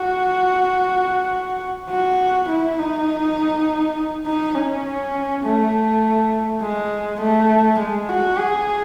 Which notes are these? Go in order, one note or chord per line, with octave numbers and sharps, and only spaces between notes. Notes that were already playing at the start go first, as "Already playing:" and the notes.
Already playing: F#4
F#4
E4
D#4
D#4
C#4
A3
G#3
A3
G#3
F#4
G#4